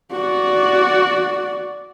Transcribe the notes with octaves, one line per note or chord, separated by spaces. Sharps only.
F#4 D5